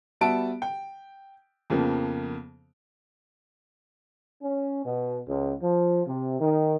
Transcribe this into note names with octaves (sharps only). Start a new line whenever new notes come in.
G3 B3 F#4 E5 A5 D7
G5
F2 C#3 F3 A#3 B3
C#4
B2
C#2
F3
C3
D#3